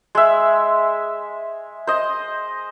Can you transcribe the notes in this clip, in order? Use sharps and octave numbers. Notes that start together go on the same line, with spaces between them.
G#3 E5
C5 D#5